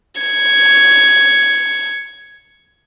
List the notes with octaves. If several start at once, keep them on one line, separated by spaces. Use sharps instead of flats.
G#6 C#7